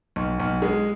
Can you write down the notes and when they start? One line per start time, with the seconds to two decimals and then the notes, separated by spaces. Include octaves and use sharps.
0.16 B1
0.40 B1
0.62 G#3